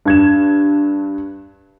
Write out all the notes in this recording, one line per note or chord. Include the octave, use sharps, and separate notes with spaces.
G2 G#6 E7